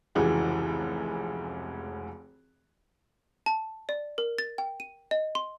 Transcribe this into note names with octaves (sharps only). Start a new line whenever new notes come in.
F1 C#2 C#3 E3 F#4 F#5
A5
D5
A#4
A6
G5
D#7
D#5
C6